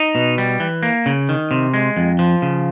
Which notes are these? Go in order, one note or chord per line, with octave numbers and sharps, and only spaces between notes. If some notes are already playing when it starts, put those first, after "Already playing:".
Already playing: D#4
B2
G3
E3
A#3
C#3
D#3
C3
G#3
F2
F3
C#3